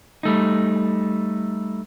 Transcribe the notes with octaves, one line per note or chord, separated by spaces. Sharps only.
G3 A3 D#4